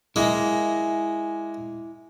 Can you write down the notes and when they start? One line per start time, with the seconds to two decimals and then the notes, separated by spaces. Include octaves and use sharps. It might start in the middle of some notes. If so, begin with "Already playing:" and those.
0.16 G#3 A#3 E4 E5 G#5